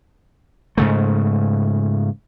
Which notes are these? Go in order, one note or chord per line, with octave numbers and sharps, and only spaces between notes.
G#2 C#3 A3